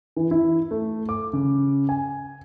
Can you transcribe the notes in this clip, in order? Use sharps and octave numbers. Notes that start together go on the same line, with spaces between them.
E3
E4
A3
D6
C#3
G#5